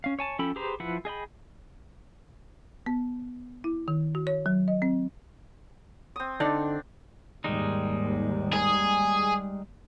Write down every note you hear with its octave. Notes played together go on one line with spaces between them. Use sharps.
C#4 F5
C#5 G#5 A5
F3 C#4 A4 G5 B5
G4 G#4 B4 C5 A#5
F3 E4 B4 F#5
G#4 D#5 G5 B5
B3
E4
D#3
F#4
C#5
F#3
D#5
C4
C4 D#6
D3 D4 D#4 D5
D#2 G#2 G3 G#3 D#4
G#4